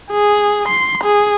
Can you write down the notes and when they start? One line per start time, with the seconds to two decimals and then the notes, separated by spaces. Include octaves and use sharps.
0.11 G#4
0.68 C6
1.03 G#4